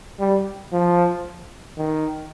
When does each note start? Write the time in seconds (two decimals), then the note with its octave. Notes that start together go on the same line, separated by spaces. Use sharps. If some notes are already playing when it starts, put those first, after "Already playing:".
0.20 G3
0.73 F3
1.78 D#3